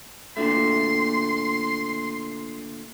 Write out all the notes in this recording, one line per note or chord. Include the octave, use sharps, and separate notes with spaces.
A#2 D3 A3 C6